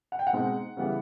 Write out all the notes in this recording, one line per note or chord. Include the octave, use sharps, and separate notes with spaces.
F#5
G5
F#5
B2 G#3 C4 D#4
C#3 E3 G3 B3